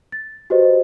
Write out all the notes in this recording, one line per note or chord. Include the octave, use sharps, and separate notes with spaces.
A6
F#4 G4 B4 C5 D#5